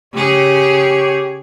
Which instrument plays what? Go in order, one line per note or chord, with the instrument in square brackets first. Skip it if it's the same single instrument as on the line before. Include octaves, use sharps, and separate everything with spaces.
[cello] C#3 G#4 [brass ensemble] G4 C#5